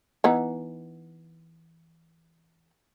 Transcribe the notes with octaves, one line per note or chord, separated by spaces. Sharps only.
E3 B3 D#4